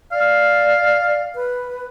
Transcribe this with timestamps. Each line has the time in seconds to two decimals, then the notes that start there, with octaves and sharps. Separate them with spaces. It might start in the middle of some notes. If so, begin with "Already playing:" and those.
0.12 D5 F5
1.35 B4